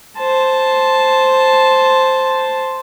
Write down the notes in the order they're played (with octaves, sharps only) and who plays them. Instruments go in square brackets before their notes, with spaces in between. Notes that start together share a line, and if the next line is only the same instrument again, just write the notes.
[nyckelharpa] C5 A5